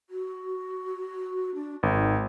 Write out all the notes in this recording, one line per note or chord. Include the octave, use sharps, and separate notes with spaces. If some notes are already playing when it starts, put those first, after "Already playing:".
F#4
D4
G#1 D#4